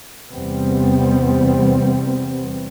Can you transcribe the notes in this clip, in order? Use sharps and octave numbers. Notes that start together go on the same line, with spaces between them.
E2 C3 G3 B3 C4